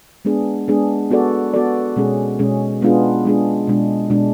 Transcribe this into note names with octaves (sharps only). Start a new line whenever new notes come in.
G#3 B3 D4 G#4
G#3 B3 D4 G#4
B3 F#4 A4 D5
B3 F#4 A4 D5
B2 G#3 C#4 G#4
B2 G#3 C#4 G#4
G#3 B3 D4 F4 G#4
G#3 B3 D4 F4 G#4
B2 G#3 D4
B2 G#3 D4